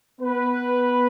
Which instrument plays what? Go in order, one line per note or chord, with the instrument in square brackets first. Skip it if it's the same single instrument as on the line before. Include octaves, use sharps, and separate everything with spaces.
[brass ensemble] B3 B4